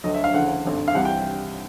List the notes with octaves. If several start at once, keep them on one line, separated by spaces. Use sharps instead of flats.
D2 D3 F#3 D#5
E5
F5
D2 C#3 E3 F#5
G#1 G2 D3
F5
C2 C3 E3 G3 F#5
G5